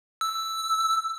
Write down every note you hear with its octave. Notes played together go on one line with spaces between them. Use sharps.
E6